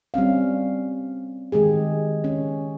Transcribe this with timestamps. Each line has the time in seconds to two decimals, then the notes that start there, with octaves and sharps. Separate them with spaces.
0.14 G3 C4 C#4 F5
1.52 D#3 G#3 G4 G#4
2.24 C#4